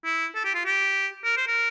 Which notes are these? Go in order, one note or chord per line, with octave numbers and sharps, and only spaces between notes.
E4
A4
G4
F4
G4
A#4
C5
A#4